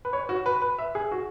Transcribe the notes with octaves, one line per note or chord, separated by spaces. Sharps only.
B4
C#5
F#4
B4
B4
E5
G#4
F#4